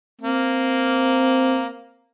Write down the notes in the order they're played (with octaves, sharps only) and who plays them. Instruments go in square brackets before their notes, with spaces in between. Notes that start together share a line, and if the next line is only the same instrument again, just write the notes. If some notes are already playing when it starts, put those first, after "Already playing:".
[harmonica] A#3 [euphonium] C4